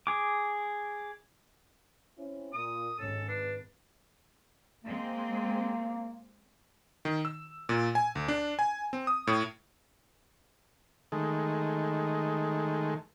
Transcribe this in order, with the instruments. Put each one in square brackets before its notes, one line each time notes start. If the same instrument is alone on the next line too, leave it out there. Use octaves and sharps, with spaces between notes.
[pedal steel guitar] G#4 D6
[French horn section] C4 C#4 E4
[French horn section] A#2 [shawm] D#6
[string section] G#1 [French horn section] C#4 [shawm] A4
[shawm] D4 [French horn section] B4
[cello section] G#3 C4 [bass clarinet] A#3
[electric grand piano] D#3
E6
A#2
G#5
D2
D4
G#5
C4
D#6
A2
[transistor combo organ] D#3 G#3 A3